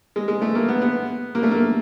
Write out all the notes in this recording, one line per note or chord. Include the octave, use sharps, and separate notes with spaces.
G#3
G#3
A3
A#3
B3
B3
A#3
A3
A#3